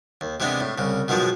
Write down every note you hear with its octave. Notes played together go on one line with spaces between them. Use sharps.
D#2
C3 E3 G#3 B3 D4
A2
C2 C#3
B2 D#3 F3 F#3 G#3